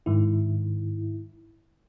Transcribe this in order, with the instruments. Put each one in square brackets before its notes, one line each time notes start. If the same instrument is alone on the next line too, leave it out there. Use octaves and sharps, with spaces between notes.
[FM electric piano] G#2 D#3 E4